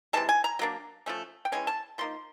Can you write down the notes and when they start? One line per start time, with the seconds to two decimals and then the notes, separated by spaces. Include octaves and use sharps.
0.13 C3 E3 G#3 A5
0.29 G#5
0.44 A#5
0.59 F#3 A#3 D4
1.06 F3 A3 C#4
1.45 G5
1.52 E3 G#3 C#4 G#5
1.67 A5
1.98 F3 A#3 D#4 C6